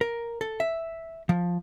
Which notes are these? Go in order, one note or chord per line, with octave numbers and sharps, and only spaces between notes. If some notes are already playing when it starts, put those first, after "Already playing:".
A#4
A4
E5
F3